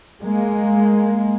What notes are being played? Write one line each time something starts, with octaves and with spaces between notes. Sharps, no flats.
G#3 A#3